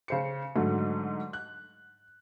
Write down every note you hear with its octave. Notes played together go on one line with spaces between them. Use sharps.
C#3 C5 C#7
G#2 D3 F#3 A3
F#6